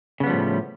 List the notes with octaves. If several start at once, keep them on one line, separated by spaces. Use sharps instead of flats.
A2 C#3 F3 G3 B3